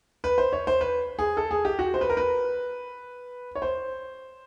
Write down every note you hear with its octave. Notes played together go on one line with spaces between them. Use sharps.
B4
C5
C#5
C5
B4
G#4
A4
G#4
G4
F#4
C5
B4
A#4
B4
C#5
C5